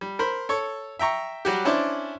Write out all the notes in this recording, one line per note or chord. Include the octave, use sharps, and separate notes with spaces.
G3
A#4 C5 B5
A4 C#5 C#6
E5 G5 A#5 C#6
F#3 G3 F#4 G4
C#4 D4 E4 C5 D5